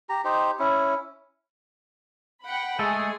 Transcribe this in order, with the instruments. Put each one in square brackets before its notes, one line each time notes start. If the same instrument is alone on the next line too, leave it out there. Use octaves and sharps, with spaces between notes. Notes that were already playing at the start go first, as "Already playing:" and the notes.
[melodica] G4 A#5
D#4 G4 C5
C#4 E4
[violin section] F#5 G5 B5
[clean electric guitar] G#3 A3 A4 [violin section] G#4